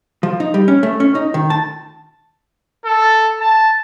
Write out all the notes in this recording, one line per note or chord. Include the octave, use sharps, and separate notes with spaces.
F3
D#4
G3
C#4
A3
C#4
D#4
D#3
A5
A4
A5